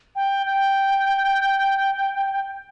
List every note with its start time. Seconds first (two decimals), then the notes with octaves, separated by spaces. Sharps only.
0.16 G5
0.46 G5